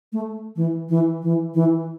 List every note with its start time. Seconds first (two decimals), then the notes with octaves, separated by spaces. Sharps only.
0.13 A3
0.56 E3
0.89 E3
1.23 E3
1.54 E3